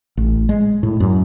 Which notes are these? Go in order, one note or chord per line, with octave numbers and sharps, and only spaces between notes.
A1
G#3
A2
F#2